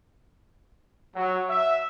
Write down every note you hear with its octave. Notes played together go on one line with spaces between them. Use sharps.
F#3
E5